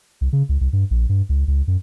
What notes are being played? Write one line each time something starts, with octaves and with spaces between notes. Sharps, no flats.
C2
C#3
C#2
C2
G2
A#1
G2
C#2
C#2
F#2